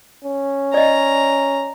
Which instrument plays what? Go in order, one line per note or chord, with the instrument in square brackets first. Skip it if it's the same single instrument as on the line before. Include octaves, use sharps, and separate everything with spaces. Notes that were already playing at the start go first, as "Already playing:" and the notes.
[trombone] C#4
[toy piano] D5 D#5 [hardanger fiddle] A#5